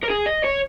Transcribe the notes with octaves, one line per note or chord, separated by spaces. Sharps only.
A#4
G#4
D#5
C#5